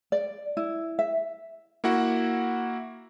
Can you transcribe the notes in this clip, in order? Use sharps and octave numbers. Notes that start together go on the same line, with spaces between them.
D5
E4
E5
A#3 E4 F#4 F#5